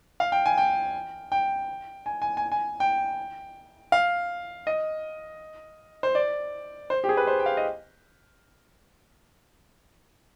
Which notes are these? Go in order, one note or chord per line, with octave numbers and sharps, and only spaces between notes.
F5
G5
G#5
G5
G5
G#5
G#5
G#5
G#5
G5
F5
D#5
C5
D5
C5
G4
G#4
B4
C5
G5
F5
D#5